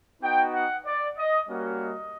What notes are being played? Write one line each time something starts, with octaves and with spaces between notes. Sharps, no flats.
B3 D#4 F#4 G5
F#5
D5
D#5
G3 A#3 C#4 F#4
D#5